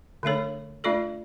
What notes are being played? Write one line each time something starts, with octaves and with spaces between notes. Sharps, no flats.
D3 A3 D4 A4 C#5
A3 D4 F4 A4 D5